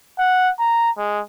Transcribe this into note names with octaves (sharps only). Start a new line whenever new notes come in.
F#5
A#5
G#3